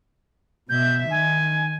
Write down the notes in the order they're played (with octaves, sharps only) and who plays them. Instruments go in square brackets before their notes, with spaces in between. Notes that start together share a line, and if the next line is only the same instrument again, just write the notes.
[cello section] B2 E5 [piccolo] G6
[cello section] D#3 [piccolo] G#5